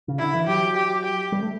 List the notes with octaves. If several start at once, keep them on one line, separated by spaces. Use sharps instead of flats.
C#3
D3 E4
E3
F#3 G4
G4
G4
G3
A3